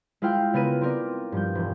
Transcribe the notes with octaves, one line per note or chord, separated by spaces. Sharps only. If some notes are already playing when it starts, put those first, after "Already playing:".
G#3 E4 F4 C5 F5 G5
C#3 B3 A#4 B4 D#7
C4 D#4 A#4 D5
G2 F3 G6
E1